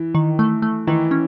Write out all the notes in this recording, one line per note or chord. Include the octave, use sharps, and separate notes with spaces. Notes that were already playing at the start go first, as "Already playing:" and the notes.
Already playing: E3
D#3
A3
A3
D#3 E3
C#4